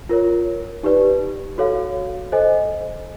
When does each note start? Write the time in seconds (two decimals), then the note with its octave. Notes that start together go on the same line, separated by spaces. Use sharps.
0.09 F4 A#4 C#5
0.83 D#4 G4 B4 D5
1.58 F#4 A4 C#5 F5
2.32 A4 C5 D#5 G#5